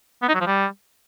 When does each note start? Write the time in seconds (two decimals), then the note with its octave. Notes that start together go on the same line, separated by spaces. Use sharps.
0.22 B3
0.28 D#4
0.34 F#3
0.40 F3
0.47 G3